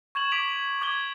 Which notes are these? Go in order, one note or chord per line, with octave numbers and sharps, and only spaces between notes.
C#6 G#6 E7 F#7
C#6 D6 B6 D7 F7 F#7
D6 G#6 G7